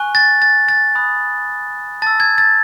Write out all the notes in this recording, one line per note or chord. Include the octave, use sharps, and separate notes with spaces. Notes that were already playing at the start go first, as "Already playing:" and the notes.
Already playing: G#5 C#6 F#6
A6
A6
A6
B5 D#6 F#6
A5 E6 A6
G#6
A6